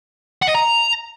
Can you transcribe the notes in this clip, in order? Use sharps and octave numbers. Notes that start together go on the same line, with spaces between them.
F#5
D#5
A#5